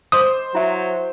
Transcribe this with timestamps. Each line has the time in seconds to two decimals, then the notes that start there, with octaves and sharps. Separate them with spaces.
0.12 C5 D#5 D6 D#6
0.55 F#3 E4 E5